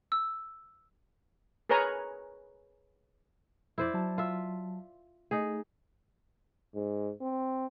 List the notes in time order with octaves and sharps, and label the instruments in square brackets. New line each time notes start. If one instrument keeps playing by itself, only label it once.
[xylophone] E6
[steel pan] G#4 A#4 B4 C#5 G#5 A#5
[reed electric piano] F2 [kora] E4 C5 D5
[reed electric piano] F#3 A5
[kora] F4 E5
[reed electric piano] A3 [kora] D#4 G#4
[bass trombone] G#2
C4